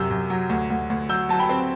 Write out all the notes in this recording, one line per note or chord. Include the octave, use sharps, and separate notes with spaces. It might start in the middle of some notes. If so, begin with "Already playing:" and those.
Already playing: F#2 C3 E6 G6
F#2
F#3
D2
D2
D2
F#3 E6 G6
F#3 A5
G5 B5
C4